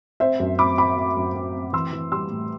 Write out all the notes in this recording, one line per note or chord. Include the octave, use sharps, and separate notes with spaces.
C4 C5 E5
F#2
C4 B5 D6
C4 B5 D6
C4
F#2
F#2
C4
E3 C6 E6
E3
G3 C6 E6
A2